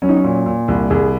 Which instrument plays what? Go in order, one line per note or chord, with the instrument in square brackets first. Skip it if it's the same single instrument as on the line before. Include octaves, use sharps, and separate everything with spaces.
[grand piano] F#3 C#4
D#4
C#4
A#2
A#2
C2
C2 G#4